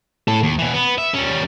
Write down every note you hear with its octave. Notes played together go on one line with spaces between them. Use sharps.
A2 A4
D#2
B2 E3
B3
E5
G3 C#4